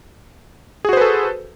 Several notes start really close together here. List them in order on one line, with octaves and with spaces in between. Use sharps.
G#4 F#4 C5 B4 A4